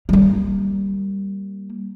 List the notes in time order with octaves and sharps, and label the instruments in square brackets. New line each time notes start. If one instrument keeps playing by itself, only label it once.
[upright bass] G3 A#3